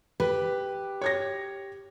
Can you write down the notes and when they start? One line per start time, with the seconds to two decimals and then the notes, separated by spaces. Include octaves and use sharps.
0.20 G4 B4
1.01 C#5 G#6 A#6